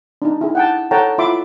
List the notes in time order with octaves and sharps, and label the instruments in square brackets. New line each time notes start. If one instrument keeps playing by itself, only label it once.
[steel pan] D4 D#4
E4 G#4
F#5 G5 A5
A4 C#5 F#5 G5 A5 A#5
E4 F4 E5 B5 C6 D6